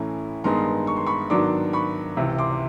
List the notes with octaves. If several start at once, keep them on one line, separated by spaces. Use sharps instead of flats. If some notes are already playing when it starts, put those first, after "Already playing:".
Already playing: A2 E3 A3 C#4 E4 A#5
G2 D#3 G#3 B3 D#4 A#5 C6
C#6
C6
B5 C#6
G#2 D#3 F#3 B3 D4 C6 D6
B5 C#6
C#2 C3 E3
C6 D6